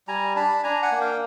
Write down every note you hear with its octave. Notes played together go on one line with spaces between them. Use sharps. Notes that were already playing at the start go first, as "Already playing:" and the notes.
G3 G#5 A#5
D4 A5 B5
D4 G#5 A#5
F#5 G#5
A#3
F5 G5